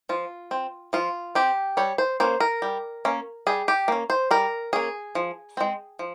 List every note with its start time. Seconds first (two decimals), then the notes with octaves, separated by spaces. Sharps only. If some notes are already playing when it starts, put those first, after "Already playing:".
0.09 F3 F4
0.51 C4
0.93 F3 F4
1.35 C4 G4
1.77 G3 C#5
1.98 C5
2.20 A#3 C#4 C5
2.40 A#4
2.62 G3
3.05 A#3 C#4
3.47 G3 G#4
3.68 G4
3.88 A#3 C#4
4.10 C5
4.31 G3 A#4
4.73 A#3 C#4 G#4
5.15 F3
5.57 G#3 C4
5.99 F3